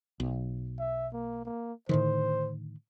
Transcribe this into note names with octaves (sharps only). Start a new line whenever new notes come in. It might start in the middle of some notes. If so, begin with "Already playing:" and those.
B1
E5
A#3
A#3
A2 D3 D#3 C5